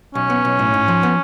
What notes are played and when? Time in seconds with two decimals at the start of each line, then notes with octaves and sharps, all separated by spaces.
0.15 B1 C#4
0.30 B3
0.45 B1
0.59 A2
0.74 G#2
0.88 F3
1.03 B3